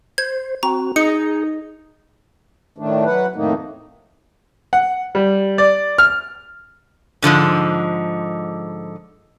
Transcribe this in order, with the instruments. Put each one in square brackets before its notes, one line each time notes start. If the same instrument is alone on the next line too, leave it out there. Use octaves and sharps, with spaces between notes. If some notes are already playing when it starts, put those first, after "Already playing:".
[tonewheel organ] C5 [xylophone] G#6
[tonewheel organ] C4 F#4 [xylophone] A#5
[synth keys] D#4 [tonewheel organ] G#4 [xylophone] C#7
[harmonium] A2 D#3 A3 D4
F#3 B4 F#5
F2 A2 D#3 A3 A#3 D#4
[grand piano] F#5
G3
D5
F6
[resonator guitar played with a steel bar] G#2 D3 F3 G#3